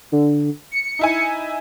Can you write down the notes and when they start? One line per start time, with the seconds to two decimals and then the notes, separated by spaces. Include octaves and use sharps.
0.12 D3
0.72 C#7
0.99 D#4 E4 G#5